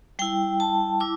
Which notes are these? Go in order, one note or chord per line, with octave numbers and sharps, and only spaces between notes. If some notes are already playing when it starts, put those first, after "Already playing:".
G3 E4 G5
A5
E4 D6